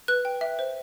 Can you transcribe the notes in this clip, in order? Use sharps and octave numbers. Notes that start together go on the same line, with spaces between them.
B4 F#6
G5
E5
C5